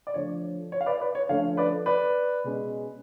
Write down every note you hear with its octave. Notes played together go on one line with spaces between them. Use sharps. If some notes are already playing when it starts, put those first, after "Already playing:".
D5
D3 F3 A3 C#5
C#5
F5
B4 D5
B4 D5
C#5
D3 F3 A3 C#4 C#5 F5
B4 D5
B4 D5
B2 G#3 C#4